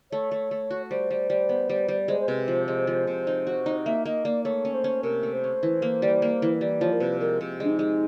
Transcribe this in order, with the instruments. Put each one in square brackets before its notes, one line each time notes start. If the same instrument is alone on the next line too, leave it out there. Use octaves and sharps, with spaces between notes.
[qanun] A3 [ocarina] C#5
[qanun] A3
A3
F#4
[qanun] G3 [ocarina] C5
[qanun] G3
G3
B3
G3
G3
[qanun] G#3 [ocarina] C5
[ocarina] C5
[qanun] C3 [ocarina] B4
[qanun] F3 [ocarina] C5
[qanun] G#3 [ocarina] C5
[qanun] F3
C3
D#4
F#4
D#4
[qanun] A#3 [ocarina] E5
[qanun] A#3 [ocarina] D#5
[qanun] A#3 [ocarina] D5
[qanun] A3 [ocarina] C#5
[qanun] C#4
[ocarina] C5
[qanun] C#4
[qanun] C3 [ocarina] A#4
[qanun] A3
[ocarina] C5
[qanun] C#4
E3
A#3
G3
A#3
E3
G3
[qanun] F3 [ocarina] C#5
[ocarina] A#4
[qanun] C3 [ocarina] B4
[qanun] G#3 [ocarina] A#4
[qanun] C3
[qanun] G#3 [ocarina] D4
[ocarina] D#4
[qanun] G#3